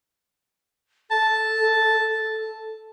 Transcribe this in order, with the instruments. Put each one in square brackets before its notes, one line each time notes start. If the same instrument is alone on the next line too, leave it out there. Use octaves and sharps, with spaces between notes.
[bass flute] A4 [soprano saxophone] A5